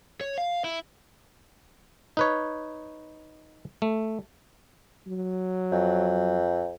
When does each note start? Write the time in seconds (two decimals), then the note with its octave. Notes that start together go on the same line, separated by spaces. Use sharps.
0.21 C#5
0.38 F5
0.65 E4
2.17 D#4 B4 C#5
3.82 A3
5.07 F#3
5.72 F2